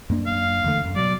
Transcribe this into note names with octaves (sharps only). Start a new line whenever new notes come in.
F#2 A#3 D4
F5
E2 D3 A3
F#2
B2 F#3 D5